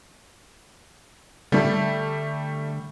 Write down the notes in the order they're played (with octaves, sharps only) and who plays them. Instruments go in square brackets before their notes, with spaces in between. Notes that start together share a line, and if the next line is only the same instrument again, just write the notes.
[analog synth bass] D3 [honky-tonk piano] G3 A3